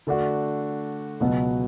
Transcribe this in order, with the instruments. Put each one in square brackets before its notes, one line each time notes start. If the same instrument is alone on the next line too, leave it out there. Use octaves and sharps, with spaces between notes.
[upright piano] D3 A3 D4 F#4
C#2 B2 F#3 B3 F#4